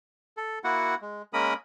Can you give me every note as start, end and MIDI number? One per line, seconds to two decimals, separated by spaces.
0.37 0.59 69
0.64 0.95 58
0.64 0.95 64
0.64 0.95 66
0.64 0.95 78
1.02 1.22 56
1.33 1.54 56
1.33 1.54 58
1.33 1.54 61
1.33 1.54 70
1.33 1.54 83
1.33 1.54 87